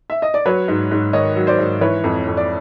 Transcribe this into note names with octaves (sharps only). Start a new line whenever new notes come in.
E5
D#5
D5
F#3 B4 C#5
G#2
G#2
D#3 C#5 D#5
F#3
C5 D5
G#2
E3 B4 C#5
F2
F2
D5